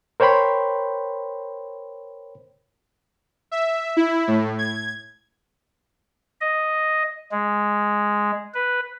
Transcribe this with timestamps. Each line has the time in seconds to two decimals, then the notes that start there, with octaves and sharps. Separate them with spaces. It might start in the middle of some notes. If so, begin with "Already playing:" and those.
0.20 A#4 C5 C#5 G5 B5 C6
3.51 E5
3.97 E4
4.28 A2
4.59 G#6
6.41 D#5
7.31 G#3
8.54 B4